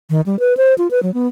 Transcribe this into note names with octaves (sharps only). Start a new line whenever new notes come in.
D#3
G3
B4
C5
F4
B4
F#3
B3